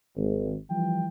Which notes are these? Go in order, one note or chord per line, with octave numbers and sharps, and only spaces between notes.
G#1
E3 F3 G3 G5